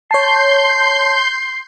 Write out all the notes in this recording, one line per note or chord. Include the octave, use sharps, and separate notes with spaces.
C#5 A5 C6 G6 C7